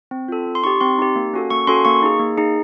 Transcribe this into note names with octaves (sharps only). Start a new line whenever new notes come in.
C4
F4 A4
C4
C6
D#4 G4 C#6
C4 C6
D#4 G4
A#3
C#4 F#4 A4
A#3 C#6
C#4 F#4 A4 C6
A#3 C#6
D#4 G#4
A#3
D#4 G#4